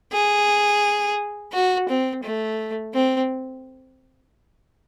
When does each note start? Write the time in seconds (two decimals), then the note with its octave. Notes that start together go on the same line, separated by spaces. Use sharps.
0.12 G#4
1.53 F#4
1.88 C4
2.23 A3
2.94 C4